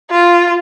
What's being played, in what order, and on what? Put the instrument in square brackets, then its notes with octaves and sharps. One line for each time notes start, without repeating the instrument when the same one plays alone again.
[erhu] F4